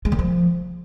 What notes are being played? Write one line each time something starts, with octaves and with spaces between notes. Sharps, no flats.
G#3
D#3
F3